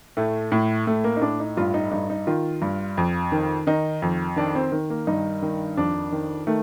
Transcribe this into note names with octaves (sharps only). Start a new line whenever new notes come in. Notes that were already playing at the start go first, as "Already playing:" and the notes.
A2 A3
A2
A2 A3
A#3
D#4
A2 D4
D#4
G2 F4
D#4
G2 D#4
D#4
D#3 F4
G2
F2
D#3
D#3 D#4
F2
D#3 D4
C4
D#3
A#3
G2 D#4
D#3
F2 D4
D#3
D#3 A3